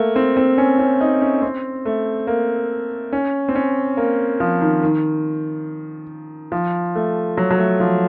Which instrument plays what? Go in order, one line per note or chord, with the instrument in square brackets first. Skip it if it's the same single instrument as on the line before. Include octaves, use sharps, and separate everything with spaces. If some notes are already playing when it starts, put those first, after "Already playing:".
Already playing: [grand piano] A3 A#3
C4
C4
C#4
C#4
D#4
C#4
C4
A3
A#3
C#4
C4
C#4
A#3
F3
D#3
D#3
F3
A3
F#3
F#3
A3
F3